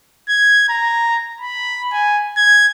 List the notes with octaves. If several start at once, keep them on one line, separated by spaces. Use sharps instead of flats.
G#6
A#5
B5
G#5
G#6